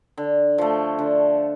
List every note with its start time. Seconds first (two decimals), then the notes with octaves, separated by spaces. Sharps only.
0.17 D3
0.58 F3 A3
0.99 D3